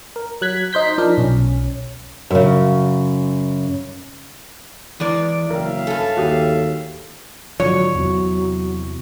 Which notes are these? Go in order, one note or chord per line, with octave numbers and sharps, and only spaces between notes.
A#4
F#3 F#6 G#6 B6
D#4 C5 G6 B6
F3 D4 D#4 A#4
B1 C#4
F#2 C#3
E2 E3 G#3 D5
F#1 A#4 C#5 E5 F5 G5
G2 A4 G#5
D#2 F#4 G4 D#6
G#2 D3 F3 F#3 C#5
E2 C3 F#3